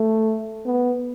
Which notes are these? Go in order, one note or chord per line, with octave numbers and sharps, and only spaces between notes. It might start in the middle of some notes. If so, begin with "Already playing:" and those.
Already playing: A3
B3